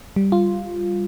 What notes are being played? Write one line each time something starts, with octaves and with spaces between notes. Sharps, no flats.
G3
F4